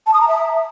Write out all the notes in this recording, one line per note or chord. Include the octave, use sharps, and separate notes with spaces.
A5
D#6
A#5
E5